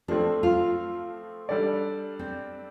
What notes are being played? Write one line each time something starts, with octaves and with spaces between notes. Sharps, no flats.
F3 A3 C4 D4
F4
G3 D4 A4 D5
C4